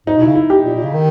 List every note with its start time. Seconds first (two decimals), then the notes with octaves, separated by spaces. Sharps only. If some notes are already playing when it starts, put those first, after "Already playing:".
0.07 G#2 D#4
0.17 B2
0.21 C#3 E4
0.35 E4
0.50 G4
0.64 A#2
0.75 A#2
0.83 C#3
0.94 D#3